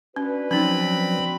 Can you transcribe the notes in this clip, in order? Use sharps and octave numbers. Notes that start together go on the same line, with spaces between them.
C#4 D4 F#4 B4
F3 F#3 C4 C#4 D#4 B5